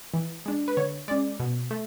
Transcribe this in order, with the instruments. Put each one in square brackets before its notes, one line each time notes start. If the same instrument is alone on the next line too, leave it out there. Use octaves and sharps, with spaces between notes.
[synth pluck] E3
G#3 D4
B4
D3 C#5
G#3 C#4 D5
B2
A3